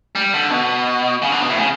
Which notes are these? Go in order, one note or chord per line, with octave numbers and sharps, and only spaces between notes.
G3
D3
B2
C#3
D3
B2
A2
C#3